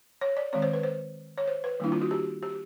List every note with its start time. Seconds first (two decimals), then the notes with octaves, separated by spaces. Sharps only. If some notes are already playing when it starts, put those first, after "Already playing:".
0.21 C#5
0.37 D5
0.53 D#3 G#3 C4 C#5
0.62 C5
0.73 B4
0.83 C5
1.38 C#5
1.47 C5
1.64 B4
1.80 D#3 G3 A#3 D4 E4
1.92 F4
2.02 F#4
2.11 G4
2.43 G4